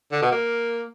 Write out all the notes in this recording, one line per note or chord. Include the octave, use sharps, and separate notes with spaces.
D3
B2
A#3